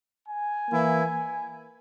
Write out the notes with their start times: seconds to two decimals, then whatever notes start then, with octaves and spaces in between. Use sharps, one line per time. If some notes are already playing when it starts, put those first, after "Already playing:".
0.26 G#5
0.71 E3 A#3 E4